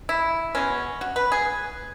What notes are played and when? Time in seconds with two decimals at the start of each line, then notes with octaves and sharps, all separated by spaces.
0.09 E4
0.55 B2 G#3 B3 C#4
1.01 F#4
1.16 B4
1.32 G#4